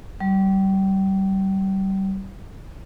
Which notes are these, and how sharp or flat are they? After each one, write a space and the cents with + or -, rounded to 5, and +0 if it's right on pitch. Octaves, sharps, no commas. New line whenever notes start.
G3 -30